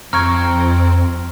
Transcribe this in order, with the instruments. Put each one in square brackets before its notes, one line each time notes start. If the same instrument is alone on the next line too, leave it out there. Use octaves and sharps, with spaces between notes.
[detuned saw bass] F2 [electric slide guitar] C4 [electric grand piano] A#5 C#6 G#6 [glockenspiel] F6